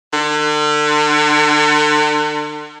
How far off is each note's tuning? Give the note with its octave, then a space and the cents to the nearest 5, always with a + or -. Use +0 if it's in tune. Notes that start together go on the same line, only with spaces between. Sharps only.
D3 +35